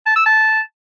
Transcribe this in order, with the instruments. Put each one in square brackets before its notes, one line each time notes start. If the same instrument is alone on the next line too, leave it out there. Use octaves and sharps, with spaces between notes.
[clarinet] A5
E6
A5